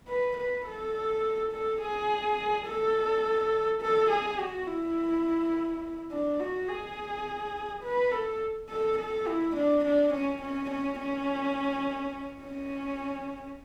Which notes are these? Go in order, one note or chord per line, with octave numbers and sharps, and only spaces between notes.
B4
B4
A4
A4
G#4
A4
A4
G#4
F#4
E4
D4
F#4
G#4
B4
A4
A4
A4
E4
D4
D4
C#4
C#4
C#4
C#4
C#4